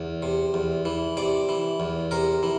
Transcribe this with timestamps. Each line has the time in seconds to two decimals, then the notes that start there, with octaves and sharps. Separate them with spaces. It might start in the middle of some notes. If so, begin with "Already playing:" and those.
Already playing: E2
0.23 C3
0.54 E2
0.85 E3
1.17 C3 D5
1.49 E3
1.80 E2
2.11 C3 A#4
2.43 E3